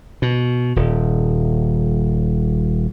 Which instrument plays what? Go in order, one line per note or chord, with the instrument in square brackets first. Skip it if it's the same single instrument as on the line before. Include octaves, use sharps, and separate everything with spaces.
[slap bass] B2
D#1